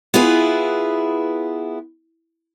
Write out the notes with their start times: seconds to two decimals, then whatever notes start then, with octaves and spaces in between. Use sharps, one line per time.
0.14 B3 E4 F4 G#4 B4